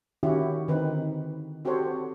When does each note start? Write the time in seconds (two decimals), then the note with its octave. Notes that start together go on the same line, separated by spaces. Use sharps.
0.23 D#3 C#4 E4 F#4 G4
0.68 D3 D#3 C4 D#4 B4
1.65 C4 F#4 G4 A4 C5 C#5